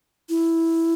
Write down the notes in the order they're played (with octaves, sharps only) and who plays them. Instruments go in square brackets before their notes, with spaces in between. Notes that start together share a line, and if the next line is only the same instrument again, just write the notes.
[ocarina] E4